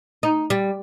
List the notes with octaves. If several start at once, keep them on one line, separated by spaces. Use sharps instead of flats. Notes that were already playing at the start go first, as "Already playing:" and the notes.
D#4
G3